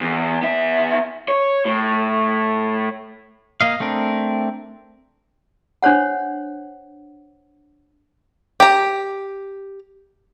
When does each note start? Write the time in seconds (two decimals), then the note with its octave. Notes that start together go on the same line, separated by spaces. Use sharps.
0.01 E2
0.42 B3 E5
1.28 C#5
1.65 A2
3.61 A#3 D#5 F5
3.80 A3 C4 D4 A#4
5.83 D4 C5 C#5 F#5
8.60 G4 A#5